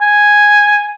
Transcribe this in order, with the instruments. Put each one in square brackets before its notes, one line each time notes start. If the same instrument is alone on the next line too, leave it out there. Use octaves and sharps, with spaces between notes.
[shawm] G#5